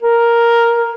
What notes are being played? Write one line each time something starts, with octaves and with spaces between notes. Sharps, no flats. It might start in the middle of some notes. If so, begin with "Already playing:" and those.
A#4